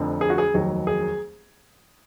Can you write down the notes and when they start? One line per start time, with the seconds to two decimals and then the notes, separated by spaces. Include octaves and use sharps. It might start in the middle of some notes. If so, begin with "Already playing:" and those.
Already playing: F1 F2 D3
0.21 G#4
0.30 F#4
0.38 G#4
0.54 F1 D#2 D#3 F#3
0.87 G#4